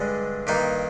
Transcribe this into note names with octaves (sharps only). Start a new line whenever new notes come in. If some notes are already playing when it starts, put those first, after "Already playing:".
Already playing: G2 D3 G#3
G2 D#3 A#3 D#4